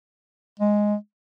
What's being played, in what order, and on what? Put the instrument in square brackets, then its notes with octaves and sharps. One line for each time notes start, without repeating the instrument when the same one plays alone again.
[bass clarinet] G#3